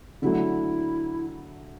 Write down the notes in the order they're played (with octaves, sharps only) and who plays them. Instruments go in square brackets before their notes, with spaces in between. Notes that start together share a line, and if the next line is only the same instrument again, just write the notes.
[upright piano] D3 F#3 A3 [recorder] E4